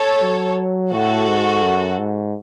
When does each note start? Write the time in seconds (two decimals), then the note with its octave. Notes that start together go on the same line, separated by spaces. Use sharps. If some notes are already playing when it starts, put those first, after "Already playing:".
Already playing: A4 C#5
0.22 F#3
0.92 A2 F#4 A4
1.28 G#2
1.63 F#2
1.99 G#2